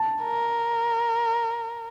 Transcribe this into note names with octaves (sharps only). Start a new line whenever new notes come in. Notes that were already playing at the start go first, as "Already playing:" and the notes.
Already playing: A5
A#4